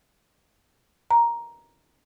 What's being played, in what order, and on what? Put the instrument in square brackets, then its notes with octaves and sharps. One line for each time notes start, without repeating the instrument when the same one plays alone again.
[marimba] A#5